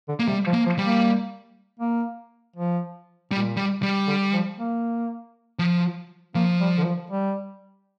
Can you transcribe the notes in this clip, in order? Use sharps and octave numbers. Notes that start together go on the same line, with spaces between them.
D3
A#3
C3 G3
F3
A#3
F3
G3
A#3
A#3
F3
A#2 G3
G3
G3
D3
F3
A#3
F3
F3 A#3
G3
D3
F3
G3